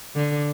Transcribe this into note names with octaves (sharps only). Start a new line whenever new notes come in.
D3